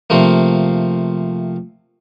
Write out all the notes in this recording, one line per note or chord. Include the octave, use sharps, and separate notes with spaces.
C3 F3 A3 A#3